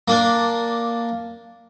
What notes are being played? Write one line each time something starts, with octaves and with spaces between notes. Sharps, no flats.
A#3 D4